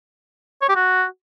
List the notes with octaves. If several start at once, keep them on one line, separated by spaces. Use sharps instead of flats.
C#5
G4
F#4